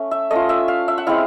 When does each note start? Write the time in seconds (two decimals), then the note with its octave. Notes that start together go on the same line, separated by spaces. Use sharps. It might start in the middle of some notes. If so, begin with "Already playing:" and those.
Already playing: A3 C#4
0.11 E5
0.31 A3 C#4 F4 D#5
0.49 E5
0.68 F5
0.88 E5
0.98 F#5
1.07 G#3 C4 E4 F5